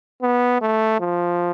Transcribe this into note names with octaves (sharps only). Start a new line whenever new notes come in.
B3
A3
F3